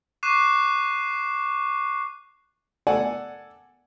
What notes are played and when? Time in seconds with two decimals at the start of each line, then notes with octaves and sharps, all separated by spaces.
0.23 C#6 D6 F#6 C7 E7
2.87 A4 D5 F#5 G#5